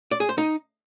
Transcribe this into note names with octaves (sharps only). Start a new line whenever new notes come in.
D5
G#4
C5
D#4